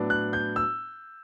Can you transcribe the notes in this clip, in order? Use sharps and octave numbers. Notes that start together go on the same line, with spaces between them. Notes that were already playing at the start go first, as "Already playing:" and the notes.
Already playing: A2 F#3 B3 D4
F#6
G6
E6